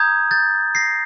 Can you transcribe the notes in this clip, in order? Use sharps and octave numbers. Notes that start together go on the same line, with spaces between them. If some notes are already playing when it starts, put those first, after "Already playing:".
Already playing: A#5 D#6 G6 G#6
G6 A6
A#6 C7